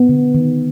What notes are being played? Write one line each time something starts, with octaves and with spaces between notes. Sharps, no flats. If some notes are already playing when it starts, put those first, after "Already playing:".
Already playing: B3
D3
D#3